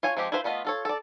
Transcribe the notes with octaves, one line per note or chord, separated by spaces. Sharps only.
F4 C#5 G#5
F3 G#3 C4 G4
E4 F4 B4 C5
A3 B3 F4 D#5
F4 A4 C#5
A4 D5